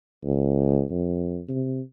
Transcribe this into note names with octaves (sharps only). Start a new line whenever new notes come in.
C#2
F2
C3